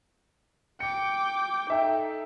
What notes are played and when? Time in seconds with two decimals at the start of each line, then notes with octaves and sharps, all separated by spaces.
0.80 G5 D6 C#7
1.70 D#4 A4 E5 G5